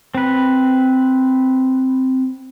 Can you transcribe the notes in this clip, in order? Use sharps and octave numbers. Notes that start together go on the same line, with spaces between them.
C4 B4